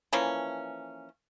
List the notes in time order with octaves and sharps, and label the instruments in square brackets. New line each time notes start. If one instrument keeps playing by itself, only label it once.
[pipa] E3 F3 A#3 C#4